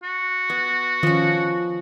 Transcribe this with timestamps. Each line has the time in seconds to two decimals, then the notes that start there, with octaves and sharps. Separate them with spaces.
0.03 F#4
0.50 B3
1.03 D#3 F3 C#4